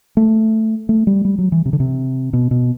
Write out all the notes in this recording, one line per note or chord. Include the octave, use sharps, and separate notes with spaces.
A3
A3
G3
G3
F#3
E3
C3
D3
C3
B2
B2